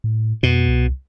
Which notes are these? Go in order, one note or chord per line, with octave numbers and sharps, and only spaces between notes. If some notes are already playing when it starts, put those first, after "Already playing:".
A2
F2 B2
C2